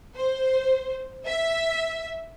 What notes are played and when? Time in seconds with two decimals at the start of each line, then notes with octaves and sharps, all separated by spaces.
0.15 C5
1.25 E5